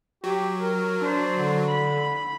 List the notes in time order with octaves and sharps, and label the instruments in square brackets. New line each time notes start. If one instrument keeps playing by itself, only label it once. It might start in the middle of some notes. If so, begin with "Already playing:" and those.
[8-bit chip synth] F#3 [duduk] G4
[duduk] A#4
[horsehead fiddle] D4 C5
[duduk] D3
[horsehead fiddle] B5